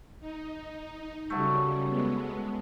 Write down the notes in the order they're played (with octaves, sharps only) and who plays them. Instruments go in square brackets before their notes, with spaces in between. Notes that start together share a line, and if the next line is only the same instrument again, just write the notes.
[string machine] D#4
[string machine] C#3 G3 [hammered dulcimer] F#3 A3
[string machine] G#3 B3